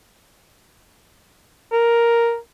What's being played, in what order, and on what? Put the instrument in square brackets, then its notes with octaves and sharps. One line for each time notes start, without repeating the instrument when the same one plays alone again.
[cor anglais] A#4